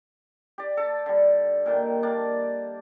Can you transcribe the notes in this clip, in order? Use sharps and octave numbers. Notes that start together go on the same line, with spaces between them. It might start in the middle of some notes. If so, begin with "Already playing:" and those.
G4 D5
A4 A5
D3 G3
A#2 D#3 G5
A#3 D4 D5 A5